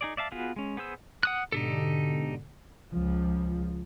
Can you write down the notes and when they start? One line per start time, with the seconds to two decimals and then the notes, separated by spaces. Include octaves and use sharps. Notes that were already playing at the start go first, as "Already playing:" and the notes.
0.01 D#4 G#4 D5
0.17 D5 E5 F5 A5
0.32 B3 F4 F#4 G#4 B4
0.56 G#3 C#4
0.77 B3 G#4 C5 E6
1.23 F#5 D#6 F#6
1.52 G#2 B2 D3 D#4 G4 A4
2.91 C#2 F3